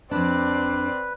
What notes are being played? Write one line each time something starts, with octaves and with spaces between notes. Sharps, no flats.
F2 C4 D4 B4 D5